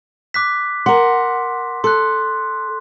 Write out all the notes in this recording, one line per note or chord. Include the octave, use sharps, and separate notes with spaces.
D6 F#6 B6
A#4 F#5 C6
A4 C6 F#6